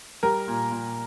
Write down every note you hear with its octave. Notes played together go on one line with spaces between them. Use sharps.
G3 A#4
A#2
A#2